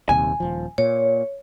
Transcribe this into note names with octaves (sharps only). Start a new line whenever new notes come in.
D#1 D#2 C3 G#5
D#1 F3
A#2 C#5